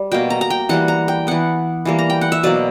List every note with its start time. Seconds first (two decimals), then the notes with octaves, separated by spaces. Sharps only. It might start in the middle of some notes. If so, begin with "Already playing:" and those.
Already playing: G3
0.12 B2 A#3 G5
0.30 A#5
0.41 A#5
0.50 G5
0.69 E3 G3 A#3 F#5
0.88 A#5
1.08 G5
1.27 E3 B3 F#5
1.85 E3 G3 A#3
1.99 A#5
2.10 G5
2.21 F#5
2.32 E5
2.43 B2 F#3 A#3 D5